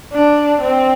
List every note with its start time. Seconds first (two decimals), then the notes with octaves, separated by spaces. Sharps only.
0.13 D4
0.61 C4